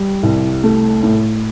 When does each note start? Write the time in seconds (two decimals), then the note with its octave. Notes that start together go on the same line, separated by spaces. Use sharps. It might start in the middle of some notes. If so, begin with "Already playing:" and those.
Already playing: G3
0.23 C2
0.63 A3
1.03 A2